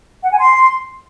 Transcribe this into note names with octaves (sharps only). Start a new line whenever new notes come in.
F#5
G#5
C6